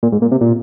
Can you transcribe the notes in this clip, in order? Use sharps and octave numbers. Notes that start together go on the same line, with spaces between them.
A#2
G#2
A#2
C3
A#2